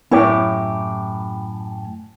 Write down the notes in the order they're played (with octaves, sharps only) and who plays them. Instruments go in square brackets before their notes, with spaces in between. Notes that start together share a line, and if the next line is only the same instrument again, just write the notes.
[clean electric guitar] F#2 A2 G4 [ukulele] E4 C#5